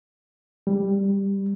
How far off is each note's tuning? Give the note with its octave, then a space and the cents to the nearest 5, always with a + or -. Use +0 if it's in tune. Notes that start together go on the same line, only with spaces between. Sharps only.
G3 +10